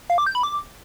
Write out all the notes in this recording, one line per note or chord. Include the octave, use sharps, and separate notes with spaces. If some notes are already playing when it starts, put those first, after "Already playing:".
F5
D6
G6
B5
D6